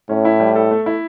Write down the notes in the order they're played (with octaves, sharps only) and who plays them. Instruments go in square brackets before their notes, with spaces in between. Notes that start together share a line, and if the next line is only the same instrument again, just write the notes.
[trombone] A2 [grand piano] C#4
[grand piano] E4
G3
A4
A3
E4